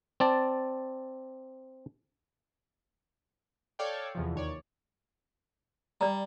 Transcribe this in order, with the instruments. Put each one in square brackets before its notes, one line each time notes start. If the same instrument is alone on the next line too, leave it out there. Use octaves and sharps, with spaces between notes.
[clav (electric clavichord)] C4 D5 A5
[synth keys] A4 C#5 D5 F5 G5
E2 C3 F3
D#2 C#5 D5
[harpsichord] G3 [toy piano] D5 A#5